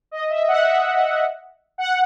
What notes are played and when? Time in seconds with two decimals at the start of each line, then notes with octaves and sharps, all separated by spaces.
0.11 D#5
0.30 E5
0.48 F#5
0.67 E5
1.78 F#5